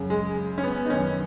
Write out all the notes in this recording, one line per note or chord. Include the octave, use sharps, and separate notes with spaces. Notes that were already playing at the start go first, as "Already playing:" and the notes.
Already playing: F#2 C#3
G#3
C#4
B3
D#4
F#2 D#3 C#4